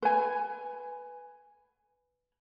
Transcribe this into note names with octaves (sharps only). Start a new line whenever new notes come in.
B4 G#5